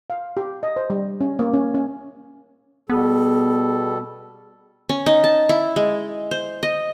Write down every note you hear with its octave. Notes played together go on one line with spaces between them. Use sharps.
F5
G4
D#5
C5
G3
C#4
A#3
C#4
C#4
B2 G3 B3 G#4 A4
C#4
D#4
A5
E4
G#3
C5
D#5